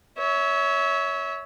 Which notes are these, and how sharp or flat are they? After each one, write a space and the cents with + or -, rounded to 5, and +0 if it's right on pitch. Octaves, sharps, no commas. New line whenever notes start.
C#5 +20 E5 -20